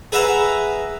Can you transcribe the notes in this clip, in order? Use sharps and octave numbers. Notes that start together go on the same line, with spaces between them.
G#4 B4 E5 F#5 A#5